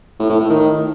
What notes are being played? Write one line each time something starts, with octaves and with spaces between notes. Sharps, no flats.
A2
A2
A2
D#3